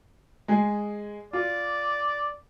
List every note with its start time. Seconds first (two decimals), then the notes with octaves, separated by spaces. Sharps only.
0.48 G#3 G#4
1.33 F4 D5